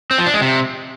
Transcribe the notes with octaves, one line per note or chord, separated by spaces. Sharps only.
C4
F3
D4
G#3
C3